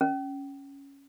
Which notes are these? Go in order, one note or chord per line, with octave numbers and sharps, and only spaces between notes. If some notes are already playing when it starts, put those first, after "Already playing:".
C#4